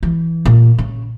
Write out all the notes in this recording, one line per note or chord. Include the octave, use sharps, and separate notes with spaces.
E3
A#2
C#3